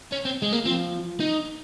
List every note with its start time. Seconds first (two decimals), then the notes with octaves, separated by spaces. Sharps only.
0.12 C#4
0.25 C4
0.42 G#3
0.53 A#3
0.65 F3 C4
1.20 D#4